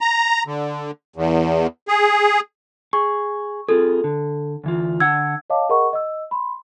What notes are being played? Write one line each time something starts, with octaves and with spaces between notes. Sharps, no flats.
A#5
D3
E2
G#4
G#4 C#6
C4 F4 G#4 A4
D3
D2 E3 F4
D3 F#5 E6 G#6
C#5 D#5 F5 A5 D6
G#4 A#4 D#5 F#5 B5 C#6
D#5 E6
B5 C6